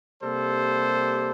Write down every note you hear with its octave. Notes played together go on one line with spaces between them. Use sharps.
C3 G3 A#3 A4 C5